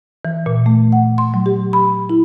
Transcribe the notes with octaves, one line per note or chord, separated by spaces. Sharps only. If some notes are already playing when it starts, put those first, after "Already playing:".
E3
A#2
A3
F#5
C6
F#3
G4
B5
E4